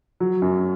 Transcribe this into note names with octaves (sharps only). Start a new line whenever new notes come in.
F#3
F#2